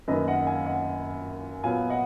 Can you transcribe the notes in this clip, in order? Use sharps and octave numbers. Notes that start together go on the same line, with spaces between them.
F#2 D#3 A#3 B4 D#5
D#5 F#5
F5 G#5
D#5 F#5
A#2 F#3 B3 F5 G#5
D#5 F#5